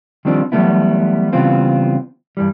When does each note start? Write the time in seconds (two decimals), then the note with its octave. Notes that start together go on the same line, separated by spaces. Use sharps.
0.25 D#3 F3 G3 C4 D4
0.52 E3 F#3 G3 A3 B3 E4
1.33 C#3 E3 G3 B3 C4 F4
2.37 G2 E3 G3